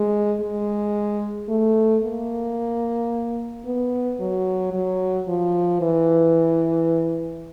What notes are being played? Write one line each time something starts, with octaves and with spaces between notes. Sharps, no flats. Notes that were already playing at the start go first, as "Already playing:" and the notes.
Already playing: G#3
G#3
A3
A#3
B3
F#3
F#3
F3
E3